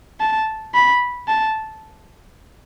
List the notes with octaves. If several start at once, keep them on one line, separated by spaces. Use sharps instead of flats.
A5
B5
A5